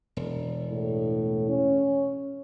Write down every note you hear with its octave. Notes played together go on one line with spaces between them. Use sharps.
E1
A2
C#4